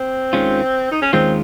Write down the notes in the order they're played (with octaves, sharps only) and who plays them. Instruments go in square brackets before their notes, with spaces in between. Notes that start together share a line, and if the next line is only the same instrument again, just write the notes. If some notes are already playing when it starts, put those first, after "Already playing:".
Already playing: [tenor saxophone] C4
[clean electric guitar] D#2 D#3 G#3 C#4 F4
[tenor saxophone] D#4
C#4
[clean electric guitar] D#2 D#3 G#3 C#4 F4 [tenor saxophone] C4